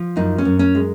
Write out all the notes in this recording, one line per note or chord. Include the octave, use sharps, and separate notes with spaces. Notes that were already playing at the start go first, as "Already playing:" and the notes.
Already playing: F3
F#2 D#4
C#4
F#2
C#4
G#3